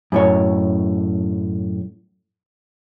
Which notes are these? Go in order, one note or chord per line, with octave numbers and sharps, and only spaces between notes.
F#2 A2 C#5